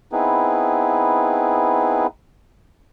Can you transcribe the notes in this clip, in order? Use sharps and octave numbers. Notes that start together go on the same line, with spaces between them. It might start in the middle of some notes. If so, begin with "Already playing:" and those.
B3 C4 D#4 E4 G#4 B4